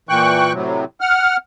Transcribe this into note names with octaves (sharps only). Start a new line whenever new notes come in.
A#2 E3 G5 C#6 F#6
A2 C3 F#3
F#5 F6